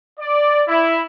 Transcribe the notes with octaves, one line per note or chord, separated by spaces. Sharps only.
D5
E4